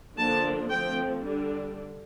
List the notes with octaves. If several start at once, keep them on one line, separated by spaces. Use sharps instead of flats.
D3 F3 A#3 D4 A5
F3 A3 C4 G5
D3 G3 D4